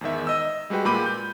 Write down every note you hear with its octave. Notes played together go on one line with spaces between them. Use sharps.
E2 G#2 D#3 E5
D#5 E6
G3 G#3 F#4 B4 G5
A#2 G#3 B5 D6 G6 D#7
G6